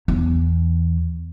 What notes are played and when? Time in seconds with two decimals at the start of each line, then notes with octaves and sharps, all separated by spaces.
0.08 E2